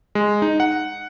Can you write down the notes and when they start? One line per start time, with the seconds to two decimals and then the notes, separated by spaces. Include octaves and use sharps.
0.15 G#3
0.42 D#4
0.60 F#5